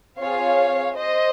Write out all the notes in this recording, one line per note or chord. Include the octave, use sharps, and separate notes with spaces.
C4 F4 G#4 C#5 F5
C5 D#5